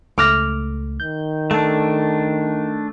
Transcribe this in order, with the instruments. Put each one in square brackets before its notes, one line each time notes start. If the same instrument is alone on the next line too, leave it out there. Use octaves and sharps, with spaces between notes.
[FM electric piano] C#2 A3 [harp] D6 F6 A#6
[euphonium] D#3 [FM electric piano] G6
[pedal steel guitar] A3 D4 [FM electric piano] A4